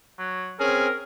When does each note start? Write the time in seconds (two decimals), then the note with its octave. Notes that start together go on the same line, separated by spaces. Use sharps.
0.19 F#3
0.59 C4 C#4 G#4 A#4